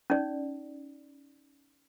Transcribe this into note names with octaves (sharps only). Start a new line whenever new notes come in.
C#4 D#4 D5